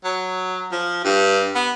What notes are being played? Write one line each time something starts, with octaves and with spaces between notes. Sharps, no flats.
F#3
F3
G2
B3